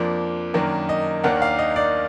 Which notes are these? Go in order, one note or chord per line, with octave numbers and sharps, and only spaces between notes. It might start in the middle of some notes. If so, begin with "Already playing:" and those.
Already playing: F2 F3 A#3 D4
F#2 D#3 A#3 D4
D#5
D#2 D#3 A#3 D4 F#5
F5
D#5
D5